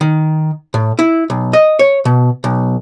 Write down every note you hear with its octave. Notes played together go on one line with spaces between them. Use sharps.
D#3
A2
E4
B1
D#5
C#5
B2
B1